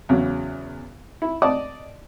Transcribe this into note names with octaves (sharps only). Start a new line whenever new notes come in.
E2 C#3 F#3
E4
D5 D#5 A5 D6 D#6